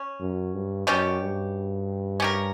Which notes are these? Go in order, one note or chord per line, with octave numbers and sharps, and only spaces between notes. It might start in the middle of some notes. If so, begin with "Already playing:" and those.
Already playing: C#4
F#2
G2
F#2 B2 G3 C#4 G4
G2
C#4 G4 A#4